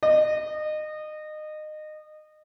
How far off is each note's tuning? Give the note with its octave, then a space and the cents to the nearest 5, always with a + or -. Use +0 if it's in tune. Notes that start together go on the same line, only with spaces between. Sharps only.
D#5 -25